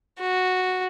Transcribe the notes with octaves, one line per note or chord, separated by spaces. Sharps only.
F#4